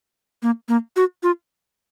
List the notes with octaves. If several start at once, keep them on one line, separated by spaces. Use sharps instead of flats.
A#3
A#3
F#4
F4